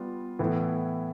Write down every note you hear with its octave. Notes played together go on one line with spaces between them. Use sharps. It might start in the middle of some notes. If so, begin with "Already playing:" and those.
Already playing: G3 B3 F4
A2 E3 B3 E4